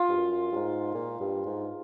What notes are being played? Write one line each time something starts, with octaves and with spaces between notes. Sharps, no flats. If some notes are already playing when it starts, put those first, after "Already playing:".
Already playing: F4
G2
F#2
G2
G#2
A#2
G2
G#2